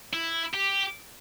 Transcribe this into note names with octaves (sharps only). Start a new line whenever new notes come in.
E4
G4